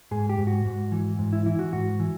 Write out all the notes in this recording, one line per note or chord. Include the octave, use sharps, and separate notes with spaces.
G#2 G#4
G4
G#2
F#4
G#2
E3
G#2
E4
E3 E4
F#4
G#2 F#4
E3